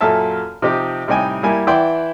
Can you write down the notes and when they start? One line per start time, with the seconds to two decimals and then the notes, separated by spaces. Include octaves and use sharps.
0.01 F#2 A#2 A4 E5 A5
0.62 C3 F3 D#4 G4
1.07 A2 C3 G3 D#4 G5 G#5
1.43 G3 A#3 E4 G#5
1.67 E3 E4 D5 F#5 G5 C6